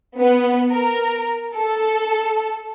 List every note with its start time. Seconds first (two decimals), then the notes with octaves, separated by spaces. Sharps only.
0.18 B3
0.71 A#4
1.56 A4